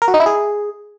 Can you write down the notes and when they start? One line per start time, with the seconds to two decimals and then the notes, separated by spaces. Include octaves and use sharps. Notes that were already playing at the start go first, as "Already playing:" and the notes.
0.02 A#4
0.08 F#4
0.14 D#4
0.20 E4
0.26 G#4